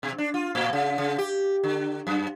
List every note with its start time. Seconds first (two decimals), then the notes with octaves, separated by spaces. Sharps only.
0.03 B2
0.18 D4
0.34 F4
0.55 A2
0.73 C#3
0.98 C#3
1.18 G4
1.63 D3
2.07 F#2